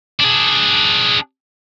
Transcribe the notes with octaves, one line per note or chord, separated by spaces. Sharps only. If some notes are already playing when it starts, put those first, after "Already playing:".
D4 G#4